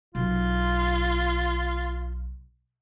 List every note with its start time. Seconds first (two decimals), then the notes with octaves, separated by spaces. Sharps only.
0.15 B1 F4